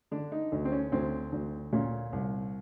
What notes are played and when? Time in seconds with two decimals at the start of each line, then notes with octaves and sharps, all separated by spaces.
0.11 D3 D4
0.32 D#4
0.52 D2
0.65 C4
0.72 C#4
0.92 D2 C4
1.32 D2
1.73 A#2 C#4
2.13 C2